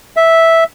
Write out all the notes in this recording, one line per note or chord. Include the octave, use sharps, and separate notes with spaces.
E5